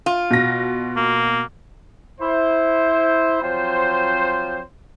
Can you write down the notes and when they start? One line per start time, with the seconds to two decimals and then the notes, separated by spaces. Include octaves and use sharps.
0.06 F4
0.31 B2 A#6
0.96 A#3
2.21 E4 C5
3.43 F3 F#3 C4 C5